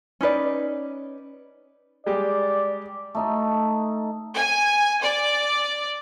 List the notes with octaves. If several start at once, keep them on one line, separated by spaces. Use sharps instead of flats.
C#4 D#4 B4 D5
G3 G#3 G4 D5
A3 D#4 A4
G#5
D5